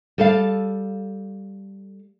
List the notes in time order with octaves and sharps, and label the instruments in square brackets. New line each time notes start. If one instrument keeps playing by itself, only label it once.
[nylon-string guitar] G3 A4 F5